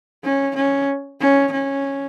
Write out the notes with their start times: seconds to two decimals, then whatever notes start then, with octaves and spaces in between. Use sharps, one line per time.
0.24 C#4
0.55 C#4
1.20 C#4
1.52 C#4